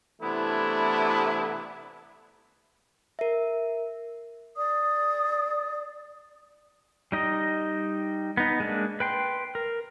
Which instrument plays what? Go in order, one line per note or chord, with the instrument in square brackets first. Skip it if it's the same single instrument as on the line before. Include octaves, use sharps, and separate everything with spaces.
[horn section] C3 E3 A3 B3 D4 E4
[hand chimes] A#4 E5
[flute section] D5 D#6
[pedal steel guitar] G3 D#4 D#5
B3 D#4
G#3 A#3 D4
B4 G5 C6
A#4